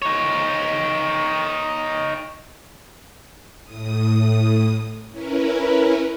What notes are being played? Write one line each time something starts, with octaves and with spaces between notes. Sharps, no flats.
D#4 C#5
A2 D#6
C#4 E4 A#4 B4